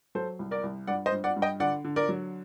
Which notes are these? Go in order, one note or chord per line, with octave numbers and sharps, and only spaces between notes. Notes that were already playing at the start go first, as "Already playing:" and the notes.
F#3 A4 C5
C2
A#4 D5
C2
G2 D5 F#5
C5 D#5
G2
D5 F#5
G2
D#5 G5
D3 D5 F#5
D3
A#4 D5
F#3